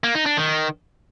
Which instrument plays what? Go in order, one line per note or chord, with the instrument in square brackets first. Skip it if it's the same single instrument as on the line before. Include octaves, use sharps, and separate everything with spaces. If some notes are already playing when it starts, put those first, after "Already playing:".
[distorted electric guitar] A#3
D#4
D4
D#3